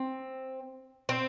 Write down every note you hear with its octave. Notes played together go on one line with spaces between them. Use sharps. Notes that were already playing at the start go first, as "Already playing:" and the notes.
Already playing: C4
C4